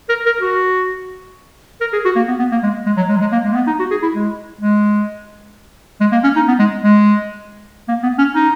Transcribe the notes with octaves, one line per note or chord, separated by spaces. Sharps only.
A#4
A#4
F#4
A#4
G#4
F#4
A#3
B3
B3
A#3
G#3
G#3
F#3
G#3
F#3
G#3
A#3
G#3
A#3
B3
D#4
F#4
G#4
E4
G#3
G#3
G#3
A#3
C#4
D#4
B3
G#3
G#3
A#3
B3
C#4
D#4